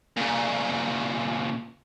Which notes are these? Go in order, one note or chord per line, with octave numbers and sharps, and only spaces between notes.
A#2 C#3